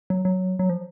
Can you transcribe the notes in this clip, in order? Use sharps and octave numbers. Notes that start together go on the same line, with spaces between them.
F#3
F#3
F#3
F3